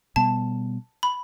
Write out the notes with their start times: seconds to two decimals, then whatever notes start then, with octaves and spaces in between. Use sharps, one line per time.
0.16 B2 G3 B3 A5
1.03 B5